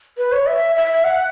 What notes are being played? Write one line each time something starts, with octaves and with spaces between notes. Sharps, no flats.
B4
C#5
E5
E5
F#5